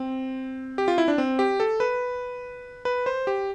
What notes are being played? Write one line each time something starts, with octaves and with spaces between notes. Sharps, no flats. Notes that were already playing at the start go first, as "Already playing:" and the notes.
Already playing: C4
G4
F4
E4
D4
C4
G4
A4
B4
B4
C5
G4